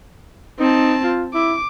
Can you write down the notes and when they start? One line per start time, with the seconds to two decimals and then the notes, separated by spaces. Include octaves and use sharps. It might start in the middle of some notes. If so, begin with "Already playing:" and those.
0.60 C4 D#4 A5
1.03 F4
1.34 E4 D6